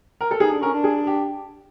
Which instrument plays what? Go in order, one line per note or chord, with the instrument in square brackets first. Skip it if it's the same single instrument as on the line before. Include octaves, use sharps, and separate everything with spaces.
[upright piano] A#4
A4
[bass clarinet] D#4 [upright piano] G#4
[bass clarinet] D4
[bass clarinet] C#4 [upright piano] A#4
[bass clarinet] D4
[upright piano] G#4
G4